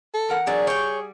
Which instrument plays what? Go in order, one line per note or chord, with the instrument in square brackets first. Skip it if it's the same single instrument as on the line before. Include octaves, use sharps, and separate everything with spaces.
[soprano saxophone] A4
[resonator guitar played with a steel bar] E2 A#4 F#5
[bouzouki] F#3 D4 [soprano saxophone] G#4
[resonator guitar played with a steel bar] G3 [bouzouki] C#5 G5